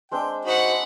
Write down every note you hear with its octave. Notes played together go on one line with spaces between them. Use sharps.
G#3 C4 D4 G5
D#4 F#4 C5 F#5 B5